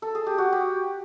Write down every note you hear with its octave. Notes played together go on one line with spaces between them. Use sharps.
A4
G#4
G4
F#4
G4